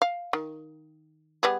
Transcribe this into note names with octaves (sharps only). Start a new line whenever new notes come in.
F5
D#3
G3 B3 G#4